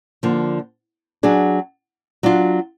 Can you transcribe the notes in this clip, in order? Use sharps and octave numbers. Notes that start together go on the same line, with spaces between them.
D3 F3 A#3
F#3 D4 G#4
F#3 D4 F4